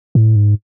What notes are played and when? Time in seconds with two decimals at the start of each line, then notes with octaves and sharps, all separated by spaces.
0.15 A2
0.36 G#2